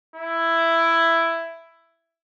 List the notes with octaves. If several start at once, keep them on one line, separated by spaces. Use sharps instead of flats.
E4